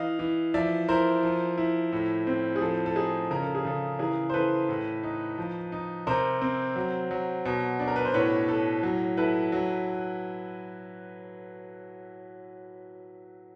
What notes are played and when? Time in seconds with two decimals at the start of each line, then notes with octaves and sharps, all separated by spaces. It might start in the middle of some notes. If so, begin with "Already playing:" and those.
Already playing: E3 D#5 F5
0.19 E3
0.54 F3 D5 E5
0.89 E4 A#4 C5
1.23 F3
1.58 E4
1.92 A2
2.27 C4
2.56 G#4
2.61 F3 A4
2.86 A4
2.96 D#4 G#4
3.31 C#3 A#4
3.42 A4
3.55 G#4
3.65 C#3 A4
3.99 E3 G#4 A#4
4.30 C5
4.34 E3 A4 B4
4.69 A2
5.03 D#4
5.38 F3
5.72 D#4
6.07 C3 A#4 C5
6.42 C4
6.76 F#3
7.11 F#3
7.45 B2
7.80 D4
7.88 A#4
7.96 B4
8.05 C5
8.14 A2 B4 C#5
8.48 A2 A4
8.83 F#3
9.17 E4 A4 B4
9.52 F#3